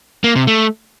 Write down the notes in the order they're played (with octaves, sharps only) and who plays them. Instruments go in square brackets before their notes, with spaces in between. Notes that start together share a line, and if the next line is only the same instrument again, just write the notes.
[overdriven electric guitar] A#3
C3
A3